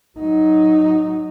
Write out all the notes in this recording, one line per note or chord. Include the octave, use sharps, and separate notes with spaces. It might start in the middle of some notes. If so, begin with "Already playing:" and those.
F#3 D#4